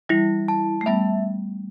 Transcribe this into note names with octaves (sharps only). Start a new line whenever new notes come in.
E3 G3 E4
A5
A3
G3 B3 E5